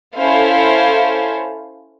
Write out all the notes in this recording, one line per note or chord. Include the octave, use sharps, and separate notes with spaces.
C#4 E4 A4 C5 F5